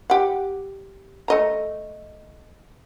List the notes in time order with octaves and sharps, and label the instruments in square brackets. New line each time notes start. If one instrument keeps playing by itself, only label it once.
[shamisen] G4 F#5
A3 D#5 A#5